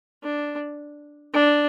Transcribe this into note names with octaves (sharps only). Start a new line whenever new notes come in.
D4
D4